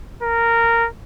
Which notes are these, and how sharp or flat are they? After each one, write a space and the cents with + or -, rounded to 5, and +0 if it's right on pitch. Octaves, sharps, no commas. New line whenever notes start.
A#4 -10